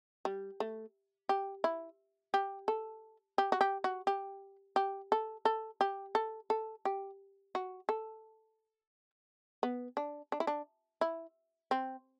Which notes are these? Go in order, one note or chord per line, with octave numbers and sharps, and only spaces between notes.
G3
A3
G4
E4
G4
A4
G4
F#4
G4
F#4
G4
G4
A4
A4
G4
A4
A4
G4
F#4
A4
B3
D4
D4
E4
D4
E4
C4